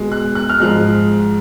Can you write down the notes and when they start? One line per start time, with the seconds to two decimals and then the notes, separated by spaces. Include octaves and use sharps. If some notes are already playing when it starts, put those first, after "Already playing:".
Already playing: B2 G#3
0.12 F#6
0.35 F#6
0.49 F6
0.60 G#2 F3 G#3 F#6